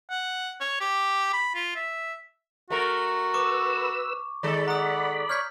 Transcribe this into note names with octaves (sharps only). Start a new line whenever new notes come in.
F#5
C#5
G4
B5
F4
E5
A3 F#4 A#4
B4 C#6 D6 E6
D#3 G#3 A4 D5 B5
F#5 A#5 D#6
C#5 F6 G6 B6